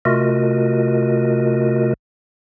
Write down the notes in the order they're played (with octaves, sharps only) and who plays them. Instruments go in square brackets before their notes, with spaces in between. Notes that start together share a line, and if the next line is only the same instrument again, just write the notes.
[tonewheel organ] C3 A3 F4 F#4 A#4 D#5